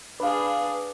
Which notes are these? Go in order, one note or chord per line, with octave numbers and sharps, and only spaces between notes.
D4 G#4 B4 F5